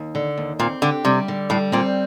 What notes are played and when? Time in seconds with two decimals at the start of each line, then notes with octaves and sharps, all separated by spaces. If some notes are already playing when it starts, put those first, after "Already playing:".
Already playing: D#2
0.15 D3
0.37 D#2
0.59 A#2 C4
0.82 D3 G4
1.05 C3 G3
1.28 D3
1.50 A2 G3
1.72 A#2 C4